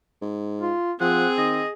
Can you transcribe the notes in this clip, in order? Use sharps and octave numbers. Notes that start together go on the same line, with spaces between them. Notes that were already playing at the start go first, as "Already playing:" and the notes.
G#2
F4
F3 C4 G#4 F#5
D#3 D#5